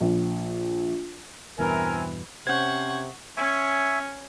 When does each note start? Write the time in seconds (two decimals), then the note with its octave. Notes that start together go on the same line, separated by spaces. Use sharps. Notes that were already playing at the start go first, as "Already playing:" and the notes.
0.01 A#1
1.59 E2 G2 B2 E3 C4 A#4 E5 G#5
2.47 C3 C#4 C5 F#5 C#6 G6 G#6
3.37 C#4 E5 G#5 C#6